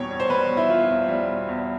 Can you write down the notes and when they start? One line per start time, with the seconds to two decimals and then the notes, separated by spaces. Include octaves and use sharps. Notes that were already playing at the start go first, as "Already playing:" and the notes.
Already playing: E2 B2 G3 C#5 G5
0.11 E2
0.20 C5
0.30 G3 B4
0.49 B2
0.57 E4
0.69 E2 F4
0.90 E2
1.08 G3
1.29 B2
1.48 E2